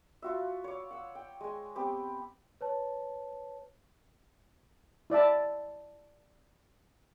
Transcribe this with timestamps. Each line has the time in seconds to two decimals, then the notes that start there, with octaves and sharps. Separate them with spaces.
0.22 F4 F#4 E5
0.64 C#5 F5 D6
0.91 F#5 E6
1.15 G5
1.41 G#3 G#5
1.75 B3 C4 G4 G5
2.61 B4 C#5 A5
5.10 E4 D5 E5 A5